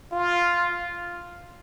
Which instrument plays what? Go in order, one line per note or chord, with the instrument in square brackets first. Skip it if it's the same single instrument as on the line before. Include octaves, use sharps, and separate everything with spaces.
[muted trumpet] F4